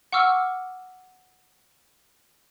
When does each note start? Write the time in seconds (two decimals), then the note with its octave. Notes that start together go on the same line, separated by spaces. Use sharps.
0.12 F#5 C#6 D6 E6 F6